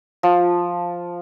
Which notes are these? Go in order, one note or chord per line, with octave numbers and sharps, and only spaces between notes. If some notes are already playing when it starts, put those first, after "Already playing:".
F3